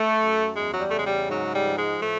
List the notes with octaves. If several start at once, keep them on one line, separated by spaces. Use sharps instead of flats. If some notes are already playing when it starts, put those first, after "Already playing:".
Already playing: A3
F#2
E2 G#3
F#3
G3
A3
C#3 G#3
G3
G#2 F#3
G3
F3
G#3
A2 A3